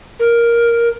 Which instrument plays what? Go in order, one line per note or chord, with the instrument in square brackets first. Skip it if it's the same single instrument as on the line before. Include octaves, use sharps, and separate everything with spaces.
[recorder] A#4